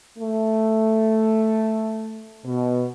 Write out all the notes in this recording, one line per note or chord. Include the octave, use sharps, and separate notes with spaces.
A3
B2